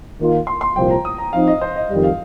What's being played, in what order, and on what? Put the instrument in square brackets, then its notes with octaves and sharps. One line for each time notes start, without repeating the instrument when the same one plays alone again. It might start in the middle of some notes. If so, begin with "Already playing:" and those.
[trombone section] D#3 A#3 F4
[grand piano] C6
C6
[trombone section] C2 A#2 F3 [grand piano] G5
[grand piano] A#5
D#6
A#5
[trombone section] F3 C4 D#4 [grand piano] F5
[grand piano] D#5
C5
D#5
[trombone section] F2 D#3 G3
[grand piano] F5